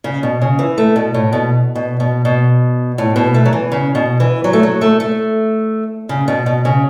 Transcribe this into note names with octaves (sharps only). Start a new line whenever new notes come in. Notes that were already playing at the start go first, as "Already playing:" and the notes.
C#3
B2
C#3
E3
A3
B2
A2
B2
B2
B2
B2
A2
B2
A3
F#3
E3
C#3
B2
E3
F#3
A3
F#3
A3
A3
C#3
B2
B2
C#3